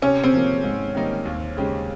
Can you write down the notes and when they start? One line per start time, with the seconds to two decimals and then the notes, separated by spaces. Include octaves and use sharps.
0.02 C3 C#4
0.23 C4
0.34 F3 A#3
0.63 G#2
0.95 D#3 G3 A#3 D#4
1.25 D#2
1.57 C#3 G#3 C#4 G4